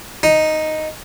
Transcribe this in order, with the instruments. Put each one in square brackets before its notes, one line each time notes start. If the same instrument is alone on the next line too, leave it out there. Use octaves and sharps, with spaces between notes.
[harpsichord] D#4